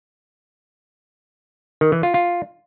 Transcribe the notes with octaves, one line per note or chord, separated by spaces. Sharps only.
D#3
E3
F4
F4